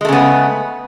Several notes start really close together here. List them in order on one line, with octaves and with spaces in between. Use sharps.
G#3 A3 C#3 B3